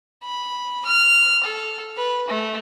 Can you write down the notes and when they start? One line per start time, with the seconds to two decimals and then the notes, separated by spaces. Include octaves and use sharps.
0.23 B5
0.85 F6
1.44 A4
1.97 B4
2.28 A3